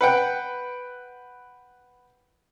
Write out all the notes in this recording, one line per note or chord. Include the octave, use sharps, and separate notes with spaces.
B4 F#5 G5